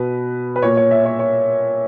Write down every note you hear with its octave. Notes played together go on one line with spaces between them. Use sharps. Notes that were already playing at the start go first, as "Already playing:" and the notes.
Already playing: B2 B4
B4
A#2 C#5
C#5
E5
C#5
C#5